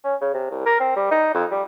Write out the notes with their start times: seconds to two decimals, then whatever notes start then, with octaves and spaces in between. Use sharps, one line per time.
0.04 C#4
0.21 C#3
0.34 C3
0.51 C2
0.66 A#4
0.80 C4
0.96 G3
1.11 D#4
1.34 F2
1.51 G3